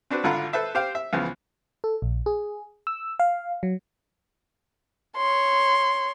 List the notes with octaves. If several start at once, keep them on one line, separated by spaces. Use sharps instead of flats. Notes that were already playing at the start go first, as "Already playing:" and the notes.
C4 D4 F#4 B4
G#1 D3 F4 F#5 A#5 B5
A4 B4 C5 E5 A5
G4 C5 F5 G5
E5
C#2 C#3 E3 F3 B3
A4
A#1
G#4
E6
F5
F#3
C#5 C6